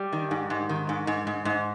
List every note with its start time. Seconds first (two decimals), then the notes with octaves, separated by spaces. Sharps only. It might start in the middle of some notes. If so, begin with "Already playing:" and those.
Already playing: G3
0.13 D#3
0.31 G#2
0.50 G#2
0.69 D#3
0.89 G#2
1.07 G#2
1.27 G#2
1.45 G#2